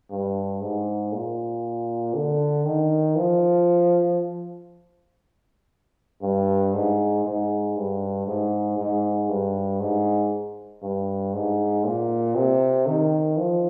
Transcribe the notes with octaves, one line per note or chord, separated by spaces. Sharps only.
G2
G#2
A#2
D3
D#3
F3
G2
G#2
G#2
G2
G#2
G#2
G2
G#2
G2
G#2
A#2
C3
D#3
F3